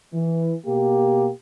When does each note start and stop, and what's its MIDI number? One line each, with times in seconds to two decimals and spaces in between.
0.14 0.53 52
0.66 1.30 47
0.66 1.30 58
0.66 1.30 67